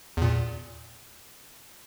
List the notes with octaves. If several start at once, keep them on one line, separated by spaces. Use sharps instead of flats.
E2 A#2